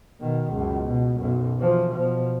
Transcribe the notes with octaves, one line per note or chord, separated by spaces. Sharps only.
B2 D#3
C#2 F#2
B2
B1 F#2
E3 F3
B2 F3